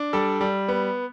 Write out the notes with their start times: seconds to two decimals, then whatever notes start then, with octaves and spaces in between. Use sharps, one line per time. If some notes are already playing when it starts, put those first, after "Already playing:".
Already playing: D4
0.13 G3 A4
0.41 G3
0.68 B3